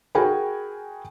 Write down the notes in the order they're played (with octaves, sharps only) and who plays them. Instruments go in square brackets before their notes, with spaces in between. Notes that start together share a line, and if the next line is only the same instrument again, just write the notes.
[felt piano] F#4 G#4 A#4 G5 G#5 B5